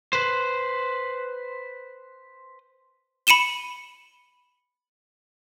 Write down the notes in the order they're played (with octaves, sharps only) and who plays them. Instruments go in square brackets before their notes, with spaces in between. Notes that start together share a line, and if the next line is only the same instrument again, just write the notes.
[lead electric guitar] B4 C5
[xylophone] B5 C#7 D#7 E7 G7